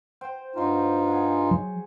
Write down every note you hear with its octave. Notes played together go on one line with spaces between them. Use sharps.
C5 G5
G2 D#4 F4 F#4 C5
G#4 F#5
F#3